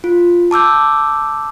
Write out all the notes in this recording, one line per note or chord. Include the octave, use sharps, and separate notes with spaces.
F4
A5 D6 E6 G6